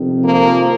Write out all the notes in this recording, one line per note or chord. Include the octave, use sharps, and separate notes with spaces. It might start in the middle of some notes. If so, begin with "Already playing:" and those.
Already playing: F2 C3 D#3
F3 A#3